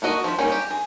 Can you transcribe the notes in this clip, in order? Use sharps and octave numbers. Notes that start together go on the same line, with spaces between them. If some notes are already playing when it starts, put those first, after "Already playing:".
A3 A#3 F#4 D#5
F3 G3 B5
G3 A#3 C#4 D#4 G#4
G4 A#5
G#4